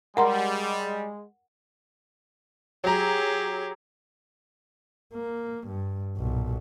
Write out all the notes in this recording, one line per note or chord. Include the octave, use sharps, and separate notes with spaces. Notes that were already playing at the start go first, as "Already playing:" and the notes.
G3 G#3 A#4 F#5 A#5 C6
F#3 G4 G#4 A#5
A#3
G2
B1 A#2